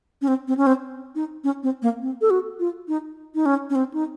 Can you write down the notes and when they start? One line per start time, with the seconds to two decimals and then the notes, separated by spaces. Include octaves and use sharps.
0.22 C#4
0.28 C4
0.48 C4
0.57 C#4
0.67 C4
1.15 D#4
1.44 C#4
1.63 C4
1.82 A#3
2.01 C4
2.21 A4
2.30 F#4
2.59 F4
2.88 D#4
3.35 D#4
3.46 C#4
3.70 C#4
3.75 C4
3.94 D#4